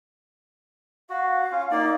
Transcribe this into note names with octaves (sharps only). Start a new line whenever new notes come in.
F#4 F5
C#4 F4
A#3 D#4 D5